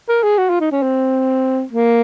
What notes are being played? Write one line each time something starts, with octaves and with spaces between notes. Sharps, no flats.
A#4
G#4
F#4
F4
D#4
C#4
C4
A#3